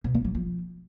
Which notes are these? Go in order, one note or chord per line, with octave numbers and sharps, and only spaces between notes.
B2
E3
F#3
F3